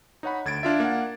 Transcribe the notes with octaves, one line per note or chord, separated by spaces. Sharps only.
D#4 C#5 F#5 B5
D2 G#6 A6 D7
D4 F4 E5
A#3 F#5